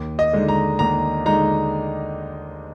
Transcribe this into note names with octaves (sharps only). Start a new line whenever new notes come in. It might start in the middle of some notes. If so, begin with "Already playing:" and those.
Already playing: D#2
D#5
D3 G#3 D#4
A#5
D#2 A#5
D3 G#3 D#4 A#5